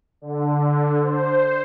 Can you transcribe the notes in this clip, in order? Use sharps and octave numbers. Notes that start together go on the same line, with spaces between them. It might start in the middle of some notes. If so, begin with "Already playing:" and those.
D3
C5